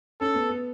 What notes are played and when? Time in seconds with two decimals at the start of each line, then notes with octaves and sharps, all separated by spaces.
0.20 C#4 A4
0.35 B3
0.49 B3